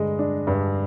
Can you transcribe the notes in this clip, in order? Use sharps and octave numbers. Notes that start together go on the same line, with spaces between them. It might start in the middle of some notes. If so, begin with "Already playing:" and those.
Already playing: G2 D3 G#3 D#5
D4
G2